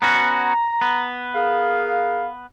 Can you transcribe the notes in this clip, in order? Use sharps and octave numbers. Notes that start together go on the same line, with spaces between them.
B3 C#4 F#4 A#5
B3
G#4 A#4 F5